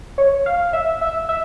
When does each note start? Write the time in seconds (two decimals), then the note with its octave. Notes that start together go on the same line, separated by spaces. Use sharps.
0.18 C#5
0.46 F5
0.73 E5
1.01 E5
1.29 E5